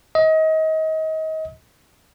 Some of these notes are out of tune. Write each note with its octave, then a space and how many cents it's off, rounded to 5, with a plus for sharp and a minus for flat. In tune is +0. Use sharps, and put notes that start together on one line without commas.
D#5 +30